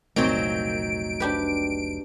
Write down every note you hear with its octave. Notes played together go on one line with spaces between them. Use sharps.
F1 C2 A#2 F#3 A3 C4 D#4 D7
D4 G4 B4